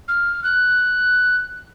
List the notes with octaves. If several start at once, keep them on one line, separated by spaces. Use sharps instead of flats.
F6
F#6